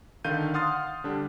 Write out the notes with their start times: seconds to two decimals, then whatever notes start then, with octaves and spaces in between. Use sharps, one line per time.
0.24 D3 D#3 A4 F5 G6 D#7
0.54 F5 F#5 C6 D#6 F6 A6
1.04 D3 G3 D4